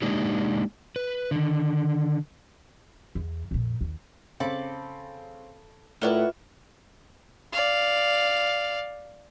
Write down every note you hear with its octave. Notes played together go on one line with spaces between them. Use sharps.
G#3 A#3 D4 D#4 G4
B4
D3 D#3
E2
F2 A#2
D#2
C#3 C4 A4 B5 D6
A2 F4 A#4 B4 C#5 D5 E5 F#5
D5 F5